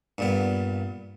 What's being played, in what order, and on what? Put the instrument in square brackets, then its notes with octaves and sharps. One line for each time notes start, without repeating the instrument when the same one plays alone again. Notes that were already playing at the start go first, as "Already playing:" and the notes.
[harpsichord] G2 A#2 B3